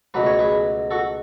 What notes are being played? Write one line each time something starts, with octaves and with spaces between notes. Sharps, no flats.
C#2 B2 F#3 A3 B4
C#5
G#4 B4
F#4 A4